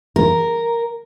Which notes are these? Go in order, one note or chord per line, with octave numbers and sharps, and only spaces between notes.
A#4